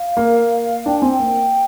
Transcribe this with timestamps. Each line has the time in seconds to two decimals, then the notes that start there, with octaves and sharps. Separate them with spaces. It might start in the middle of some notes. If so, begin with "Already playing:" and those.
Already playing: F5
0.17 A#3
0.86 D4 G5
0.98 C4 G#5
1.11 G5
1.19 A#3